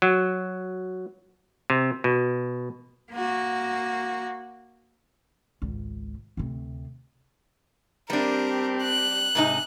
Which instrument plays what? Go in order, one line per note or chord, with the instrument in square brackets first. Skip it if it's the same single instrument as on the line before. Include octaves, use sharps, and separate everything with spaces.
[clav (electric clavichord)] F#3
C3
B2
[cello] A#3 F#4
[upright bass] G#1 C#2
D2 C3
[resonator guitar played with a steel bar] G3 D4 [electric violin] C4 G4 [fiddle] A#4
[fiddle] F#6
[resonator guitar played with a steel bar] G#2 C3 D#4